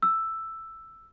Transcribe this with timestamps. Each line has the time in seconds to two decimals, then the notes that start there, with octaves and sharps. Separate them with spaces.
0.02 E6